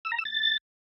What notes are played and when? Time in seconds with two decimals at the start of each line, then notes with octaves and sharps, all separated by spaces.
0.05 E6
0.12 A#5
0.18 E6
0.25 A6